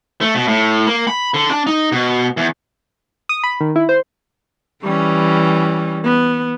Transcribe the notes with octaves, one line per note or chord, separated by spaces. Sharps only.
A3
B2
A2
A#3
B5
D3
D4
D#4
B2
E2
D#6
B5
D#3
E4
C5
E3 G3 C#4
B3